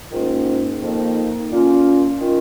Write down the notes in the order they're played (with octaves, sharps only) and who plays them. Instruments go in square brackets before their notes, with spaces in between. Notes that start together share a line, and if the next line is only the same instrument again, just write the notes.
[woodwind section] G#2 D#3 A#3 C#4 F4
F2 D#3 A#3 D#4
A#2 A#3 C#4 F4
D#3 C#4 F4